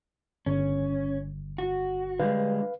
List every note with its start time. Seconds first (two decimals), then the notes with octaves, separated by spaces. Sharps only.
0.46 G1 C#4
1.58 F#4
2.19 D3 G3 G#3 B4 F5